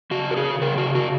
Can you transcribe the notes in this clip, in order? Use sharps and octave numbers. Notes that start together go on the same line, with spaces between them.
C#3 F#4
A#4
C#3 G#4
C#3 A#4
F#4
C#3
F#4